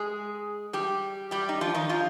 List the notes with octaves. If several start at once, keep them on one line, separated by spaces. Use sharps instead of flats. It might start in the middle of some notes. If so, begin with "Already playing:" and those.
Already playing: G#3 G#4
G3 G4
G3 G4
D#4
F3 F4
D#3 D#4
F3 F4